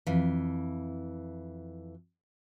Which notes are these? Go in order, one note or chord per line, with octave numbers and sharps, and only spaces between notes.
F2 E3